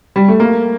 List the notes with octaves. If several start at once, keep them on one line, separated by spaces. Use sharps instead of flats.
G3
A3
A#3